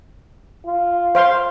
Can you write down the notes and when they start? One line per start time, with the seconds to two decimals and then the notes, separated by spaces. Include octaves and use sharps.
0.65 F4
1.15 C5 F5 C6